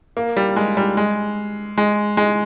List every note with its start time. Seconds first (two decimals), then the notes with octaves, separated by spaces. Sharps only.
0.17 A#3
0.37 G3
0.56 G#3
0.77 G3
0.97 G#3
1.78 G#3
2.17 G#3